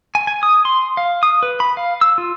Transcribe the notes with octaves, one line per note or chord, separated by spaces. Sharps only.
G#5
G#5
D#6
C6
F5
D#6
B4
B5
F5
E6
F4